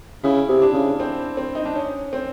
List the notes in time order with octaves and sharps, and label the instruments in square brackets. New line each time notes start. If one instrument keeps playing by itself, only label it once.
[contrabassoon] C#3 [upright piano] E4
[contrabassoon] C3
[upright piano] D4
[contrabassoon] C#3
[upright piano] C4
C4
D#4
D4
C#4
C4